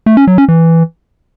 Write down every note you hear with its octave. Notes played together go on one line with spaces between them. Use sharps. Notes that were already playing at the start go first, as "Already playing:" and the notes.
A3
C#4
F#3
C#4
E3